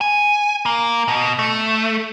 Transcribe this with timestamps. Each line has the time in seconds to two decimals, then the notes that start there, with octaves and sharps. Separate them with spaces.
0.01 G#5
0.66 A#3
1.08 B2
1.39 A3